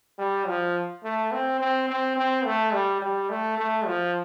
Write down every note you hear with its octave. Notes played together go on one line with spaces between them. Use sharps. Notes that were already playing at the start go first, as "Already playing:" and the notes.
G3
F3
A3
C4
C4
C4
C4
A3
G3
G3
A3
A3
F3